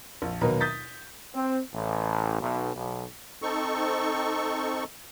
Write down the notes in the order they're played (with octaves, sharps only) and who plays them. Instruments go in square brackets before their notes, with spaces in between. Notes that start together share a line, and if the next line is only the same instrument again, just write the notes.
[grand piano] A#1
D#2 B2 F#3 D#4 A#4 B4
D#6 G6 A6 B6
[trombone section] C4
A1
B1
B1
[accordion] C4 D#4 A4 C#6